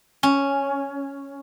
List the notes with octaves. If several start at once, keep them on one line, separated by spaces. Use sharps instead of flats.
C#4